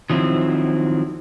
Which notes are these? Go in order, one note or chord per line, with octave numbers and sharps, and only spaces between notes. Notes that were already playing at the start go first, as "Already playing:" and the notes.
D#3 F3 F#3 C4 E4